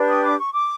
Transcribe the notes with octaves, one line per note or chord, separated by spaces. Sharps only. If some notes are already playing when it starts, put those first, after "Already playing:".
Already playing: D4 G4 B4
D#6
D6
C#6
D6